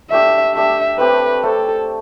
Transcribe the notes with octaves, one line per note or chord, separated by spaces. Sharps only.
A3 D4 G4 D5 E5
A3 D4 G4 D5 E5
A3 C4 G4 B4
A3 C4 G4 A4